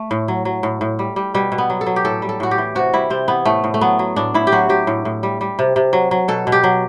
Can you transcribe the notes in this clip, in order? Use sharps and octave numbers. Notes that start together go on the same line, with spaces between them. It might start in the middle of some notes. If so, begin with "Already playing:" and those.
Already playing: A3
A2
F#3
F#3
A2
A2
G3
G3
B2 G3
B2
B3
F#3
A4
F#3
G4
A2 A4
G3
A4
A2 F#4
G4
E3
C3 F#4
G3 E4
C3 C4
E3 B3
A2 A3
A2
A3
F#3 B3
F#3
A2 D4
A2 E4
G4
F#3 F#4
F#3 G4
A2
A2
G3
G3
C3
C3
F#3
F#3
B2 A4
B2
G4
F#3